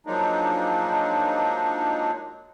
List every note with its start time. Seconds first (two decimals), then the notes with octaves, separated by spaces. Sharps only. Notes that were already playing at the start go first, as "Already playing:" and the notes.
0.06 F3 F#3 G#3 A#3 D4 D#4